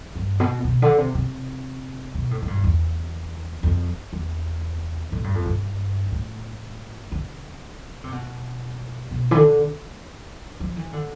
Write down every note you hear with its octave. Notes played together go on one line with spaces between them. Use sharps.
G2
B2
B2
D3
C3
C3
B2
A2
A2
G2
F2
E2
F2
E2
A2
G2
F2
G2
A2
D3
C3
B2
B2
E3
D3
F3
E3
D3